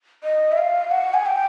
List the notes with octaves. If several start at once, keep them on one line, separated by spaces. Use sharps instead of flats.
D#5
E5
F5
F#5
G#5
G5